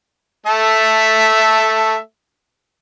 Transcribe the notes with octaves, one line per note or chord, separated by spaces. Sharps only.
A3 A4 E5